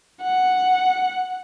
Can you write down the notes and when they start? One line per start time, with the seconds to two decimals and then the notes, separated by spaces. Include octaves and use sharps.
0.22 F#5